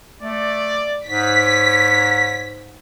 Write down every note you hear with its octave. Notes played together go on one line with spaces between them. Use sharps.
A3 D5
G#2 C#5 B6